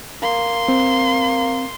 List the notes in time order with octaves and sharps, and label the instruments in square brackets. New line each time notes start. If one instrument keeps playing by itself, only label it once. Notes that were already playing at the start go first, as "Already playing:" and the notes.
[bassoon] A#3 [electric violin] C6
[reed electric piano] C4